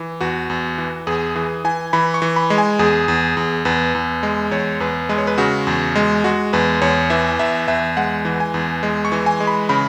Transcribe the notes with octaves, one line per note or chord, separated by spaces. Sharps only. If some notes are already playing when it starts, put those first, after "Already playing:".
Already playing: E3
E2 F#4
E2
E3
E2 G#4
E3 G#4
E3 G#5
E3 B5
C#6
E3
B5
G#3
G#5
E2 G#4
E2
E2
E2 B4
E2
G#3
E2 C#5
E2 B4
G#3 B4
C#5
B4
C#3 F#4
E2
G#3
G#3 F#4
E2 B4
E2 C#5
E3 E5
E2 E5
E2 E5
G#3 F#5
E3
G#5
E2
G#3
C#6
E3
G#5
G#3
B5
C#3 B5